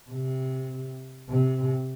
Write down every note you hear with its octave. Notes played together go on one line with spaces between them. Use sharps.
C3
C3